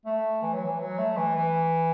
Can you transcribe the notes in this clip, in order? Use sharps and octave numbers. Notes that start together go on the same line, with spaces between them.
A3
E3
F#3
E3
F#3
A3
E3
E3